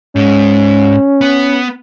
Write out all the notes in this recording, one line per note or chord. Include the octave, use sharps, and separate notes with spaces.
G#2 C#4
B3